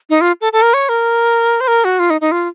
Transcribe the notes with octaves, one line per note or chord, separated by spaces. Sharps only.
D#4
F4
A4
A4
A#4
C#5
A#4
C5
A#4
F#4
F4
D#4
D#4
F4